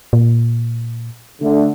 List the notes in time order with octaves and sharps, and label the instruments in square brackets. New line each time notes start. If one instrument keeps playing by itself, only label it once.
[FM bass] A#2
[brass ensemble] D3 A3